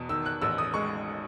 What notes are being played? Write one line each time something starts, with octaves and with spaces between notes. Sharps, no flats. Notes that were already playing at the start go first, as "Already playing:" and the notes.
Already playing: E2 B2
D#3 E6
F#6
A1 E6
D#6
G#3 C#6